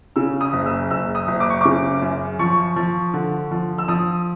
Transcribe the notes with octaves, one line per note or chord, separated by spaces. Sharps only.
C#3 E6
D#6
F#1
E6
F#1 E6
D#6
F#1
D6
C#6
C#3 D6
F#2
F3 C#6
F3
D3
F3
E6
F3 D#6